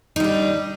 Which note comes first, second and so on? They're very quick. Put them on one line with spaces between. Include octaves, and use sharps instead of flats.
D#4 G3 D4